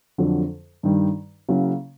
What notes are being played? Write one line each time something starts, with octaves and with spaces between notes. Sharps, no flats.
F2 D3 F#3
G2 D#3 G3
C#3 F#3 A#3 C#4 E4